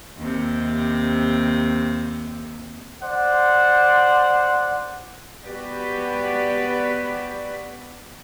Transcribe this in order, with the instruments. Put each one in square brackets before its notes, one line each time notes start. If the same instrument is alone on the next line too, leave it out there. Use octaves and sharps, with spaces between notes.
[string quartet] D#2 C3
[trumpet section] C5 D5 F#5
[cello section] B3 F#4 G4 B4 D5